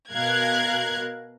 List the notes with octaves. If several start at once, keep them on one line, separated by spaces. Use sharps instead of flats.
B2 A#4 F5 F#6 G#6